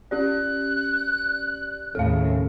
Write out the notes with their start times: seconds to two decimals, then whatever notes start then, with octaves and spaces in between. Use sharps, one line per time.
0.11 C#4 G4 D5 F#6
1.95 D#2 A2 C#3 A4 F5